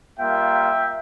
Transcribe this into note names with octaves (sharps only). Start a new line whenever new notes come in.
G3 A#3 F4 E5 G5